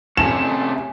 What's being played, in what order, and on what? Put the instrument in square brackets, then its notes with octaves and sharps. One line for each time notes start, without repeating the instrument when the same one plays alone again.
[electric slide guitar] C3 A3 C#4 [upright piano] E7